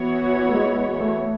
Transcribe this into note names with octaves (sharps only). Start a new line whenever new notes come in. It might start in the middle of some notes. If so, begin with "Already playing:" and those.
Already playing: E3 B3 F#4 C#5
A3
G#3
A3